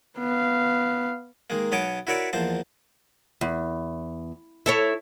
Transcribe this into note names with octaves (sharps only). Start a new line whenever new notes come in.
B3 F5
D#3 G#3 A#3
B1 B3 C#5 D#5 A5 D6
E4 F#4 A#4 C#5 D5 E5
E2 F3 A#3 C5 A5
E2
E4 A4 C#5